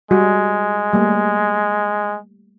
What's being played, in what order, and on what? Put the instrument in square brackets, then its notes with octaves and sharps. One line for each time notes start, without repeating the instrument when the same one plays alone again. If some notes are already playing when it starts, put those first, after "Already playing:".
[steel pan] G3 F#4 [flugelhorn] G#3
[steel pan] G3 A3 A#3